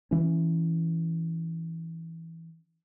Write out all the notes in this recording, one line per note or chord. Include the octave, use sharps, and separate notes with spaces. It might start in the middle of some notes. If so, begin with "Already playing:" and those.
E3 C#4